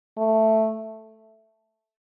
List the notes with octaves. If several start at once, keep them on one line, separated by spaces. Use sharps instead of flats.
A3